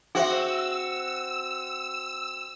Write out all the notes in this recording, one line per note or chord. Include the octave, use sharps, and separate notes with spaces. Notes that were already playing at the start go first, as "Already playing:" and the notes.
C4 F#4 G#4 C5 E5 E6